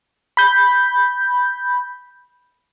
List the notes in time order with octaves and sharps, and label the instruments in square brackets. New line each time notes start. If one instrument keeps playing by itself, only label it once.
[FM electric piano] B5 G6